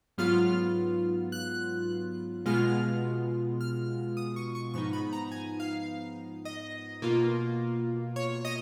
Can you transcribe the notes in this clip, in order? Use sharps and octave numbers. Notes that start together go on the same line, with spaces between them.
G#2 F#3 B3 F4 F6
F#6
B2 G#3 B3 F4 F6
F6
D#6
C#6
C#6
G#2 F3 B3 D#4 C#6
B5
A#5
G#5
F5
D#5
B2 A#3 F4
C#5
D#5